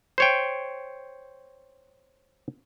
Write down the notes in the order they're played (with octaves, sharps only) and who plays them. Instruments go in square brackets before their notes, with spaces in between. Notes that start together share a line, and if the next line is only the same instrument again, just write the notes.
[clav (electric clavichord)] C5 C#5 G5